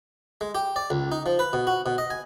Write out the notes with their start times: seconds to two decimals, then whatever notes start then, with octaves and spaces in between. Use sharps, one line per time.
0.41 G#3
0.55 G4
0.76 D5
0.90 C#2
1.12 D#4
1.26 F3
1.39 B4
1.53 B2
1.67 F#4
1.86 B2
1.98 D#5
2.10 G#5